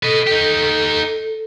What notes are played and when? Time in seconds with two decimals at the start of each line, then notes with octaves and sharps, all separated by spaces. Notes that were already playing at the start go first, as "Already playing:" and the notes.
0.03 A4 B4 D#5
0.27 D#4 G4